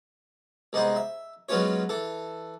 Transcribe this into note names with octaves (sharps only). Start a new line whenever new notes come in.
C2 G#3 B3 D#4 C5
E5
F#3 G#3 B3 C#4 F4 C#5
E3 A4